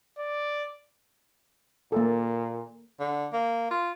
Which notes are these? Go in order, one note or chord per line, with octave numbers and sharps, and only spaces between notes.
D5
A#2 A#3 A4
D3
A#3
F4